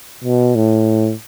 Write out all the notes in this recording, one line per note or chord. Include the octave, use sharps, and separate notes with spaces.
B2
A2